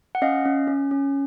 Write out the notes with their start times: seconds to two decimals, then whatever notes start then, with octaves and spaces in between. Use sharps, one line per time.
0.15 F#5
0.22 C#4 D#5 F5
0.45 C#4
0.68 C#4
0.91 C#4